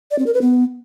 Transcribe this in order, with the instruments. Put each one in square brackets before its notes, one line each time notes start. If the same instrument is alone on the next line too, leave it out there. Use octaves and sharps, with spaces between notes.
[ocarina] D5
C4
A#4
B4
B3